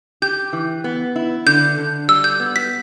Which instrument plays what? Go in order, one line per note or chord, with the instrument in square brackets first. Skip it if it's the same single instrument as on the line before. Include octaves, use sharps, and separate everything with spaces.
[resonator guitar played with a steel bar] G4 [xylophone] G6
[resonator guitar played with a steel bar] E3
B3
E4
[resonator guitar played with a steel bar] D3 [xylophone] G6
[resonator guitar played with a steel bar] D3
[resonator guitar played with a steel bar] G3 [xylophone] E6
[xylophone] G6
[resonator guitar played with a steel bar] B3
[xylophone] B6